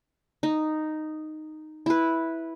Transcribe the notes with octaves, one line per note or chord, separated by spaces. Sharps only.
D#4
E4 B4